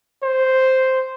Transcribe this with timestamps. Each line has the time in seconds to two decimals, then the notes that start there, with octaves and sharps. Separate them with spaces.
0.23 C5